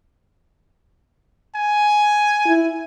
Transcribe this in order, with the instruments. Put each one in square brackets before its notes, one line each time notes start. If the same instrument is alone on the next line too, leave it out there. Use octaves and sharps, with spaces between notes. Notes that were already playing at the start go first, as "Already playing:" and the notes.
[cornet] G#5
[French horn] E4